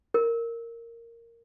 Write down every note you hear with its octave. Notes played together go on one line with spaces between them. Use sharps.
A#4